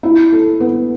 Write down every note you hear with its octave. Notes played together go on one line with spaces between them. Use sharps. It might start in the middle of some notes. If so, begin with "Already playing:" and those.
E4
A4
B3